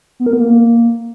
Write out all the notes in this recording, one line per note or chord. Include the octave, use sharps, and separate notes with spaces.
B3
A#4
B3
A#3